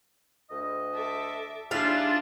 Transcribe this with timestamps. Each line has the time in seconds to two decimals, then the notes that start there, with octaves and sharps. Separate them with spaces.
0.50 D2 D#5
0.94 A4 E5 D6
1.71 D#2 G3 D4 E4 F4 G#4 F5 A6